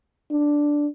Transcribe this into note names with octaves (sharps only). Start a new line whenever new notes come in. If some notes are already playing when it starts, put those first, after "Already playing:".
D4